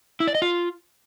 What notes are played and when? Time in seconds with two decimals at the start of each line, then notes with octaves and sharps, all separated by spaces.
0.20 E4
0.27 D5
0.35 D#5
0.42 F4